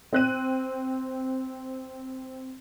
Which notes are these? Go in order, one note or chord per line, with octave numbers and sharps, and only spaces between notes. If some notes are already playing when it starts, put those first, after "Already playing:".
C4 F#6 D#7